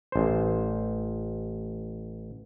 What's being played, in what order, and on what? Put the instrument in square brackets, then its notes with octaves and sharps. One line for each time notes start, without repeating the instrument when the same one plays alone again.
[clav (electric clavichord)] A1 C5